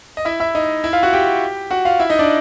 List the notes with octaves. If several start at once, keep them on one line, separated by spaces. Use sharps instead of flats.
D#5
E4 E5
E4 E5
D#4 D#5
E4 E5
F4 F5
F#4 F#5
G4 G5
F#4 F#5
F4 F5
E4 E5
D#4 D#5
D4 D5